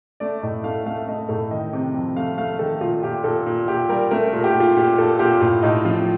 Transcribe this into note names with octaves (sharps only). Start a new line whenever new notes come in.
A3 D5
A2 D#5
A3 F5
A3 F5
A3 D#5
A2 A4
D#3 D#5
C3
F2
A3 F5
A3 F5
D#3 A4
A#2 F4
A#2 G4
A#2 A4
A#2
A#2 G4
G3 A#4
A3 A#4
A#4
A#2
G4
A#2
F4
A#2 G4
A#2 A4
A#2 G4
A2 F4
A2 D#4
F3 F4